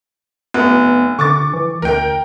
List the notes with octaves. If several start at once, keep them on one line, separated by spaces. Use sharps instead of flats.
F1 B3
D3 C#6 D6 A6
E3
D2 A#4 G5